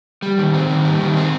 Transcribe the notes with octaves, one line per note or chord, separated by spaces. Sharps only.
G3
D#3
C4
D#3
G3
D#3
C4